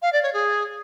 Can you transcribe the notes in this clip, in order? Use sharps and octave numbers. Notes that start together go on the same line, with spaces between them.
F5
D5
C#5
G#4